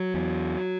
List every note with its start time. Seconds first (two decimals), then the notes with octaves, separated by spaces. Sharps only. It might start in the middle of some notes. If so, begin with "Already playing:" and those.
Already playing: F#3
0.14 E2